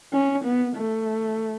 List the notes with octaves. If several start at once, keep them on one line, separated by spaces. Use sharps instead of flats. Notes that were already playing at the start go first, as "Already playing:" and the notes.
C#4
B3
A3